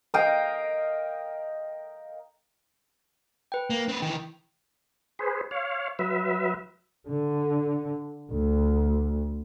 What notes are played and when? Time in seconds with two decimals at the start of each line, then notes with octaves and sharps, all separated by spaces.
0.14 A#4 D#5 F5 G5
3.52 B4 G5
3.70 A#3
3.89 C4 B4
4.02 D#3 E3 G5
5.19 G#4 B4 C5
5.51 C#5 F5
5.99 F#3 B4 E5
7.07 D3
8.31 D2